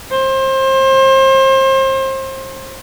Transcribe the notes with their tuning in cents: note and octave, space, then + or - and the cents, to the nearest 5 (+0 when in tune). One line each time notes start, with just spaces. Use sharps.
C5 +30